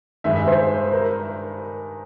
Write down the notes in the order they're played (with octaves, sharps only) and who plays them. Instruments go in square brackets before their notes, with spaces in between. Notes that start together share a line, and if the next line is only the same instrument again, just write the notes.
[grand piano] G2 D#3 G#3 [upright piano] E5
[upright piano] E5
C5
A#4